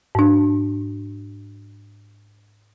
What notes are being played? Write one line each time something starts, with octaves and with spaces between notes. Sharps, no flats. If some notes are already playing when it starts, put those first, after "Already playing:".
G#2 D4